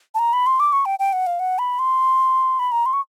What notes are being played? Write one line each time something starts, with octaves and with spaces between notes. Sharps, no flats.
A5
A#5
B5
C6
D6
C#6
G5
G5
F#5
F5
F#5
B5
C6
B5
A#5
C6
C#6